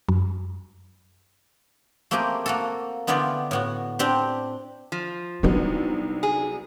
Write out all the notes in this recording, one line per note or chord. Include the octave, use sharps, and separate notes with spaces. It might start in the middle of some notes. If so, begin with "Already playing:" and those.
F#2
A3 A#3 C4 G4 G#4 A#4
A#3 F#4 A4
D3 B3 E4 F4 G4 D5
A2 B3 F#4
C4 D4 G4
F3
C2 F#3 B3 D4 D#4
G#4